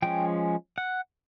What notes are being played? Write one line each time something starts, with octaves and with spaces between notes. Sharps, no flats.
F3 G#3 C#4 G5
F#5